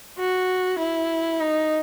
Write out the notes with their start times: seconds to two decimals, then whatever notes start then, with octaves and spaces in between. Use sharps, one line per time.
0.19 F#4
0.79 E4
1.40 D#4